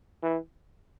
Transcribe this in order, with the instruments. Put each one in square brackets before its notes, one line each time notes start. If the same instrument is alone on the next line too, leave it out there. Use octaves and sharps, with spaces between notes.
[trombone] E3